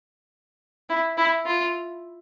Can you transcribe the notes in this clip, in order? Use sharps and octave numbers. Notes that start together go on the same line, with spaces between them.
E4
E4
F4